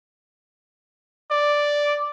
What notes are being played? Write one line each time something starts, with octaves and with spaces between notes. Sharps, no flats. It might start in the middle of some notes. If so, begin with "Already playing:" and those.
D5